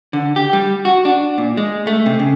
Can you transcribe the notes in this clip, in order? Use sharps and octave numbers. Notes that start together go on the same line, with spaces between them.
D3
G4
G3
F#4
D4
A#2
G#3
A3
C3
C#3